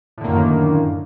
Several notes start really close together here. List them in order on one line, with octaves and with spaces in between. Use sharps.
A2 D3 A#3 F#2 D#3